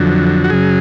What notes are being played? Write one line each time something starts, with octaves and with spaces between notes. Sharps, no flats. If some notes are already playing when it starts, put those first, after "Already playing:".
Already playing: F2 D3 F#3
F#4
F#2 C#3 F#3 G#4